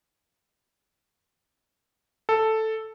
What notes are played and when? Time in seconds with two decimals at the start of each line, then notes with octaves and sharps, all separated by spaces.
2.29 A4